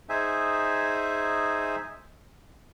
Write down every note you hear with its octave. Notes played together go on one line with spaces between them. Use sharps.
D#4 G#4 C5 E5 G#5